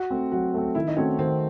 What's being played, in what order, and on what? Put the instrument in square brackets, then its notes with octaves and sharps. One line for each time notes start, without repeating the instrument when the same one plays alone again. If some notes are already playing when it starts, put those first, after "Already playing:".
Already playing: [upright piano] F#4
[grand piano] A3 C4
[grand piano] F#3 [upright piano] F#4
[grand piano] A3 C4
[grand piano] D#3 [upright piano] E4
[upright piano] D#4
[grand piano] A3 C4 F#4 [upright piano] C#4
[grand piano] D#3 [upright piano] C4